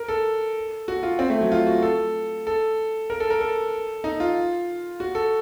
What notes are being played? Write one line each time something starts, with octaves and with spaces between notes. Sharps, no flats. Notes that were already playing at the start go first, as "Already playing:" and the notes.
Already playing: A#4
A4
F#4
F4
C4
A3
F#3
F4
F#4
A4
A4
A#4
A4
A#4
A4
D#4
F4
F#4
A4